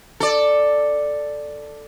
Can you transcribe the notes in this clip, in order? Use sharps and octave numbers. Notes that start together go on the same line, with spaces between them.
A4 D5